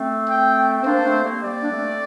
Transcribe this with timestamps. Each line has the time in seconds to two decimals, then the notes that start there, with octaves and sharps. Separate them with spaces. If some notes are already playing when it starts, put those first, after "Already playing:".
Already playing: A3 C4
0.29 G5
0.81 C4
0.85 A#3 D4 C5
1.05 A3 C4
1.24 G3 A#3
1.43 G3 A#3 D5
1.61 D4
1.71 A3 C4